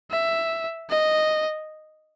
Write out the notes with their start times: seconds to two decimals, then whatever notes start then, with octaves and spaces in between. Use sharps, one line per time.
0.11 E5
0.90 D#5